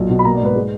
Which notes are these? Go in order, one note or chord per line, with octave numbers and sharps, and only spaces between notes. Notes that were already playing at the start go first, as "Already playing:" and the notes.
Already playing: B1 A#2
B2
B5
A#3 A#5
D5
G#2 B4
G#3